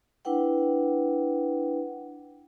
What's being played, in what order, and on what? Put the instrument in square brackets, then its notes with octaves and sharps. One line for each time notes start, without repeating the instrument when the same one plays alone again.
[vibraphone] D4 E4 B4 F#5 G5